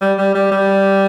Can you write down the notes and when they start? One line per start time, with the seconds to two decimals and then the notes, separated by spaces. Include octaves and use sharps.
0.01 G3
0.18 G3
0.35 G3
0.51 G3